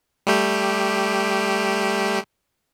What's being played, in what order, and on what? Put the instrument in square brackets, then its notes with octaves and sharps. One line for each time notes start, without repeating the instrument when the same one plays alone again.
[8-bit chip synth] G3 A3 G4